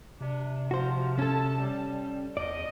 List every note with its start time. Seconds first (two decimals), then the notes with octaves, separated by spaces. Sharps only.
0.21 C3 D4
0.71 F3 F#4 C5
1.19 C#4 A4 A5
1.62 G3
2.37 E2 D5 D#5